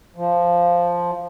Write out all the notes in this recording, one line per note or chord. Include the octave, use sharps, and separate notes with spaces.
F3